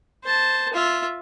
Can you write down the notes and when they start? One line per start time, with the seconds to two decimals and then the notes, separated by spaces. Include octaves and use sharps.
0.24 C5 A5
0.73 F4 E5